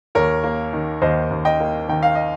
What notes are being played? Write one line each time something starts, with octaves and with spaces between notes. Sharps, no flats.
D#2 A#4 C#5
A#3
D#3
D#2 C5 D#5
D#2
D#5 G5
A#3
D#3 G5
F5
D#5